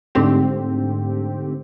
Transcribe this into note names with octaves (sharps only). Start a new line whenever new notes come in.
G#2 D3 A3 C4 G4